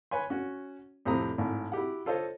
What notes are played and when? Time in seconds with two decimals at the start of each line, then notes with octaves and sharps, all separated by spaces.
0.11 B4 C#5 G#5 C6
0.30 C#4 F#4
1.05 F2 A2 C3 C4 A#5 D#6
1.38 G#1 A2
1.72 E4 F#4 G4 F#5
2.06 F4 A4 C5 C#5 D#5